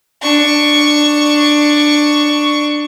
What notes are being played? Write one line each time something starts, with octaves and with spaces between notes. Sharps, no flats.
D4 C#6